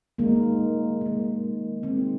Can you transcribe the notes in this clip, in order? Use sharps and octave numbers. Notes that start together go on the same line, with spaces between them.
D#3 G#3 A#3
D#3 G#3
D#3 G#3 C4